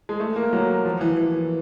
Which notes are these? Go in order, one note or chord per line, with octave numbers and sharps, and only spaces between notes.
G#3
A3
A#3
F#3
F3
E3
E3